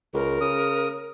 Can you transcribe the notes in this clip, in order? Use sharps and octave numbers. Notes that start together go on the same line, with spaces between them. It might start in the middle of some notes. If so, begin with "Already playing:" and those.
C#2 A#4
C#3 D#6